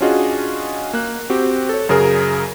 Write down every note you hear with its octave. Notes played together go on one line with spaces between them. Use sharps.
C#4 D4 F4 F#4 G#4 D#5
A#3 F#6
C4 F#4 G4
A4 C#5
F#2 C#3 G#4 A#4